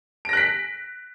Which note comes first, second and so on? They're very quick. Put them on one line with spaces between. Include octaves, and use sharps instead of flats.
D7 A#6 F#6 B6